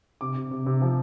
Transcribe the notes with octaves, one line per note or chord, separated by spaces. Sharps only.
C3 D6
C3
C3
C3
F3